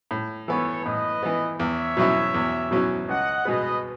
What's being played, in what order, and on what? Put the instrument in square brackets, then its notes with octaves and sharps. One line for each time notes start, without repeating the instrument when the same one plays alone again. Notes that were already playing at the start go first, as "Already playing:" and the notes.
[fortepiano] A2
[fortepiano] E3 B3 [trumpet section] A4 C#5
[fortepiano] A2 [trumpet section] B4 D#5
[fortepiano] E3 B3
[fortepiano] E2 [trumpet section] C#5 E5
[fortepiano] B2 F#3 C#4 E4
E2
B2 F#3 C#4 E4
[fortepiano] C#2 [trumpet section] D#5 F#5
[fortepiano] B2 G#3 B3 [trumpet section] B4 D#5